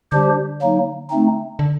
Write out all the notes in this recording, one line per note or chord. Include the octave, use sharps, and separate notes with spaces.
D3 G3 D4 G4 C5
F#3 A#3 D#4
A3 C4 D#4
D3